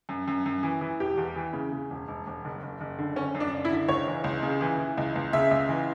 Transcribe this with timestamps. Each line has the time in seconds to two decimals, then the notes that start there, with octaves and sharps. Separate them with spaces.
0.09 F#2
0.28 F#2
0.46 F#2
0.63 E3
0.81 E3
1.00 E1 G4
1.17 E2
1.36 E3
1.53 C#3
1.72 C#3
1.90 E1
2.08 E1
2.27 E1
2.45 F#1
2.63 F#1
2.80 F#1
2.99 D3
3.16 D3 C#4
3.35 F#2
3.40 D4
3.52 F#1
3.65 E4
3.71 D3
3.88 C#2 C#5
4.07 E3
4.24 C#2
4.43 C#3
4.61 E3
4.78 E3
4.97 C#2
5.16 C#2
5.33 C#3 E5
5.51 C#2
5.69 E3